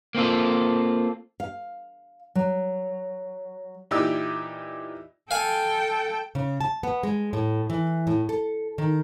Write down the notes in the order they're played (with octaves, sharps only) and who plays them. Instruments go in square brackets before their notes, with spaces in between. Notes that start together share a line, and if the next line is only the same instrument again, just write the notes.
[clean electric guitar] A#3 C4 F4 A4
[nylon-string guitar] F5
F#3
[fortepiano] A#2 E3 D#4 G4 D5 E6
[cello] A4 G5 [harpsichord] F5 G#5
[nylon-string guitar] C#3
A5
B3
G#3
A2
E3
A2
A4
D#3